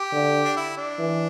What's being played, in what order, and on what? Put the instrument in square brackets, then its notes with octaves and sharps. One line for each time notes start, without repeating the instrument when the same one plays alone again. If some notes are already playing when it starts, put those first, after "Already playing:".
Already playing: [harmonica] G4
[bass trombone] D3
[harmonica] D4
E4
D4
[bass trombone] E3